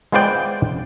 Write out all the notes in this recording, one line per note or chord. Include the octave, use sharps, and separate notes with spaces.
G#3 B3 F4 C5 D5 G5